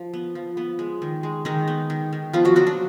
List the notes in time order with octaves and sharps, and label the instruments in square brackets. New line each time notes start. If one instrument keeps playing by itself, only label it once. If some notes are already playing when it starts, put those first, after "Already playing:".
Already playing: [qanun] F3
B3
F3
B3
G#3
D#3
G#3
D#3 G#3 D#4
B3
D#3
D#3
F3 B3 F4
F#3 F#4
D3 F#3 F#4
D4